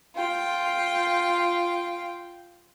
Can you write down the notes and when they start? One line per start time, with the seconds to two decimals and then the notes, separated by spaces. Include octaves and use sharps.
0.15 F4 G5